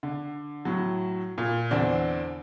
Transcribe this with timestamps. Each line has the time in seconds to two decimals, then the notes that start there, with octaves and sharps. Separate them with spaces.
0.03 D3
0.65 A2 F#3
1.38 A#2
1.71 E2 D3 C4 D4